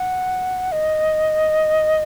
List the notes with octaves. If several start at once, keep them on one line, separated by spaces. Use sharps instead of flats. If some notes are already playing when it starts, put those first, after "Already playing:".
Already playing: F#5
D#5